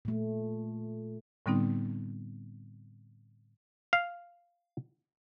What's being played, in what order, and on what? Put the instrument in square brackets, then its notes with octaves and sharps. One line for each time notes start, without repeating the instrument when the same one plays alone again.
[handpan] A#2 A3
[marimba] A2 D3 G3 B3 C4 D#4
[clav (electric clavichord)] F5